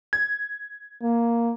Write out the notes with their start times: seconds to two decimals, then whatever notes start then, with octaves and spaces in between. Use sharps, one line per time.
0.13 G#6
1.02 A#3